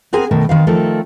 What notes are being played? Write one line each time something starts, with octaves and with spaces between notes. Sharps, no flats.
B3 C4 G#4 A#4 G#5
B2 D#3 A3 A#4
D#3 C4 F5
D#3 F3 A3 C4 A4 A#4